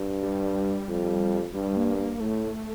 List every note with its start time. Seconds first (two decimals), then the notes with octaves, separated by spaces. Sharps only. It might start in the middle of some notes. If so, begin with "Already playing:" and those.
Already playing: G2
0.23 G3
0.89 F2
1.54 G2 G3
1.77 A#3
1.98 A#3
2.20 A2 A3